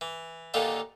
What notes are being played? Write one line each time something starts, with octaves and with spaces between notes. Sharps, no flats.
E3
D#2 A#2 D3 D#4 F4 A4